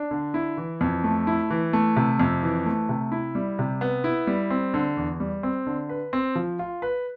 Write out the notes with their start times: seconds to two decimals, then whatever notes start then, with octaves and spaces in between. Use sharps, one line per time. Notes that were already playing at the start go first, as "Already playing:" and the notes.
Already playing: D4
0.11 D3
0.34 E4
0.57 E3
0.81 F2
1.04 A3
1.27 E4
1.50 E3
1.73 A3
1.96 C3
2.19 F2
2.43 E3
2.66 A3
2.89 C3
3.12 E4
3.35 G3
3.59 C3
3.81 B3
4.04 E4
4.27 G3
4.50 C4
4.74 D3
4.97 E2
5.20 G3
5.43 C4
5.67 D3
5.89 B4
6.13 C4
6.35 F3
6.59 F4
6.82 B4